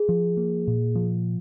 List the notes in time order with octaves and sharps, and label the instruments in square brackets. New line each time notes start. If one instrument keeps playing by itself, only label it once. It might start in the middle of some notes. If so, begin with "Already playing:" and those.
Already playing: [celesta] G#4
[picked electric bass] F3
A#3
A#2
F3